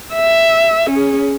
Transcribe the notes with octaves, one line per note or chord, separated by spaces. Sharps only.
E5
C#4 G#4